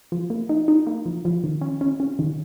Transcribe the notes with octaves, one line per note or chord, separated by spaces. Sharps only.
F3
A#3
D#4
D#4
A#3
F3
F3
D#3
C#4
C#4
C#4
D#3